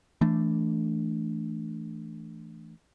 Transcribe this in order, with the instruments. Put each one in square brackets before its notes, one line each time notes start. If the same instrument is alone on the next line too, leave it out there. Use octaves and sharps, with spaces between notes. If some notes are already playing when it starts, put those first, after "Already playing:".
[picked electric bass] E3 A3 D4